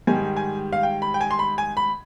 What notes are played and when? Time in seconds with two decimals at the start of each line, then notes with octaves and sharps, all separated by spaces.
0.07 G#2 D#3 G3 G#5
0.36 G#5
0.73 F5
0.83 G5
1.02 B5
1.14 G5
1.21 G#5
1.31 C6
1.39 B5
1.58 G#5
1.77 B5